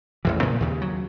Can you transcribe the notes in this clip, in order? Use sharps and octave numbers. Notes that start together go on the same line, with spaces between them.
A1 E2 E3
A#2 C#3 F3
D#2 C#3
F#3